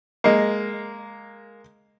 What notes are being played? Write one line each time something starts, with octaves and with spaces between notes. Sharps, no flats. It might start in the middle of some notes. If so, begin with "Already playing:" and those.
G#3 A#3